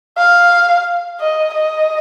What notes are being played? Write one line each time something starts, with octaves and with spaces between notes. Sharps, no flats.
F5
D#5
D#5